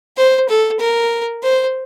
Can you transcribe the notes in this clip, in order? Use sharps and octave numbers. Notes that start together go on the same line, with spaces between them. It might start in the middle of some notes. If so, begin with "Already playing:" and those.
C5
A4
A#4
C5